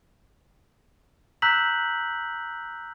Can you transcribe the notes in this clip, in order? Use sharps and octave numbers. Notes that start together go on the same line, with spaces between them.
A#5 E6 F#6 G6 B6 F#7